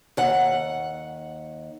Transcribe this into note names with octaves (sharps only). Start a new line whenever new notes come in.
D#2 F#5